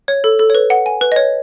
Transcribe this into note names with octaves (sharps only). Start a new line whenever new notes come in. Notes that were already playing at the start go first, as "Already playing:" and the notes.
C#5
A4
A4
C#5
B4
F#5
G#5
B4
D#5
C#5